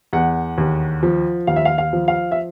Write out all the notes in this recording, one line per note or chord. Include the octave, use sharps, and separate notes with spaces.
E2 F#5
D#2
F3
D#2 F5
E5
F5
F5
F3
F5
E5